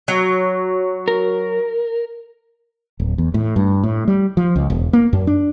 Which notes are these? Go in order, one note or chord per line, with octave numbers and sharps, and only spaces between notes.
F#3
A#4
D1
E2
A2
G2
A2
G3
F3
C#2
E1
A#3
F#2
D4